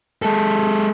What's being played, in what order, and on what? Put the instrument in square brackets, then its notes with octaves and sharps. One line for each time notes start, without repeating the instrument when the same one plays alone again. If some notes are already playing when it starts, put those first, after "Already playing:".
[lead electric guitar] G#3 A4